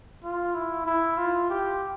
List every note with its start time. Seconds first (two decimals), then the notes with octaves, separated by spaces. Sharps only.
0.24 F4
0.54 E4
0.86 E4
1.18 F4
1.50 G4